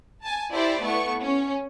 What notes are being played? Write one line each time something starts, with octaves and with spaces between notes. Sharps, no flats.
G#5 A5
E4 G4 C5 D5 E5
A3 B3 E4 C#6
C#4